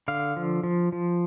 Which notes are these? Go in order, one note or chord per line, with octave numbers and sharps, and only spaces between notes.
D3 F5
F3
F3
F3